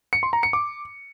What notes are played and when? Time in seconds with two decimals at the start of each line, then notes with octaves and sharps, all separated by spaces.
0.13 C#7
0.23 C6
0.33 A#5
0.43 C#7
0.53 D6